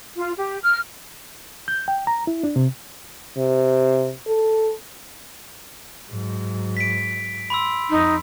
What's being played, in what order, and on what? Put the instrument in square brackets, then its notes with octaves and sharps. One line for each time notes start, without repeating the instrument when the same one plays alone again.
[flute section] F4
G4
F6
[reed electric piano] G6
G5
A#5
E4
D4
C3
[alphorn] C3
A4
[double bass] G#2 F#3
[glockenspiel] B6 D7
B5 C6 E6
[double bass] F2 [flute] D#4